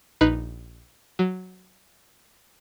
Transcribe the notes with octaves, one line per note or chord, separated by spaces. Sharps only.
A#1 D#4 B4 B5 F#6 C7
F#3